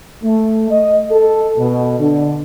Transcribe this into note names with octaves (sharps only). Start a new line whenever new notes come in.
A3
D#5
A4
B2
D3